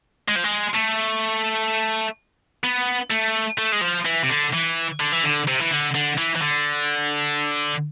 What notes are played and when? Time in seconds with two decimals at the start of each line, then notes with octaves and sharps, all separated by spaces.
0.28 G#3
0.35 F3
0.44 G#3
0.75 A3
2.64 B3
3.11 A3
3.58 A3
3.72 G#3
3.81 F3
4.05 E3
4.23 C3
4.30 D3
4.53 E3
5.00 D3
5.12 E3
5.24 D3
5.48 C3
5.60 E3
5.71 D3
5.95 D3
6.18 E3
6.35 E3
6.41 D3